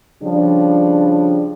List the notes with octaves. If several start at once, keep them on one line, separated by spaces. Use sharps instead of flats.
C#3 F3 G3 D4